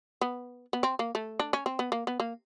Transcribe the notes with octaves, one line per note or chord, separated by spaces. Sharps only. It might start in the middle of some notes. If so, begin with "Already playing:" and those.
B3
B3
C4
A#3
A3
D4
C#4
C4
B3
A#3
B3
A#3